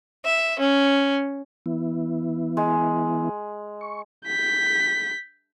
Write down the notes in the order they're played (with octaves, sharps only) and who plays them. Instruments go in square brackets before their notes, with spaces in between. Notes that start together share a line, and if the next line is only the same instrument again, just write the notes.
[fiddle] E5
C#4
[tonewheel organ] E3 B3 E4
[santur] G#3
[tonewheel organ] C#6
[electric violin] G6 B6